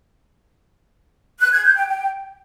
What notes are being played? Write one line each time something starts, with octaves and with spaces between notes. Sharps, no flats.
F#6
G#6
G6
G5
G5